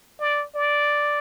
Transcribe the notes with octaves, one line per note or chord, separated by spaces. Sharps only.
D5
D5